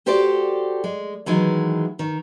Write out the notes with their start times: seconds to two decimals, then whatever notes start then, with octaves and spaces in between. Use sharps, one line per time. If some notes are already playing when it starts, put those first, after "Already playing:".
0.06 F#4 G4 A4 C5 D5
0.84 G#3
1.26 D#3 E3 F#3 G#3
1.99 D#3